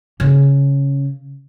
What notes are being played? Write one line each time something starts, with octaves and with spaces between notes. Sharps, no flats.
C#3